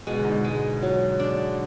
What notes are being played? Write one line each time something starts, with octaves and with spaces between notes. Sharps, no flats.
B2 G#3
D3
G#2 B2
G#3
F#3
D4